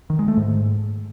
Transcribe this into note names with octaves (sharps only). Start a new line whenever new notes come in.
D#3
G#3
A3
G#2